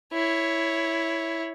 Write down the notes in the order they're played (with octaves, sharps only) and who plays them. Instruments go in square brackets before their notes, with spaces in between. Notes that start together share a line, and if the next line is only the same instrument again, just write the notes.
[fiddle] E4 C#5